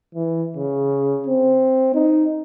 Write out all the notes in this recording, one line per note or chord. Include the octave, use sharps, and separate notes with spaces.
E3
C#3
C4
D#4